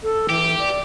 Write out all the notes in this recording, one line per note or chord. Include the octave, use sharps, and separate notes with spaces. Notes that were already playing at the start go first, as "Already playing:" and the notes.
A4
E3 G4
D5